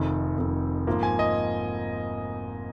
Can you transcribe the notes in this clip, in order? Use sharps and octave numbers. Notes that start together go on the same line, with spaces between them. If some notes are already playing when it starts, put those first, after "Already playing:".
Already playing: F1 F2 D#3
F1 F2 D#3
G#2 F3 A#3 F4
G#5
D#5